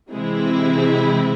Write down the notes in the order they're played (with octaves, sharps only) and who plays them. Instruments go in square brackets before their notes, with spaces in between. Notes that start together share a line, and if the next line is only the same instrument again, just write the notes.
[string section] C3 E3 G#3 C4 E4